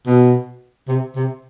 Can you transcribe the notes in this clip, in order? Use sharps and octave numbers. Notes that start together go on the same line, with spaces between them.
B2
C3
C3